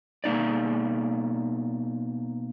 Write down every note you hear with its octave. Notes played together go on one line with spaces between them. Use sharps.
B2 A#3 D#4 D5